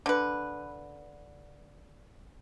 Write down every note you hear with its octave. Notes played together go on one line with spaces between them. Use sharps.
D3 B4